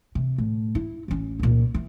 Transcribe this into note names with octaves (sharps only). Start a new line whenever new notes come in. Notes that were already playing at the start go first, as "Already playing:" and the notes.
C3
A2
E4
A1 C#4
C#2 A#2
E3